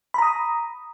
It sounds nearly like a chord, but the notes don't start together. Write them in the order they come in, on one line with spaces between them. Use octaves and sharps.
B5 A#5 D#6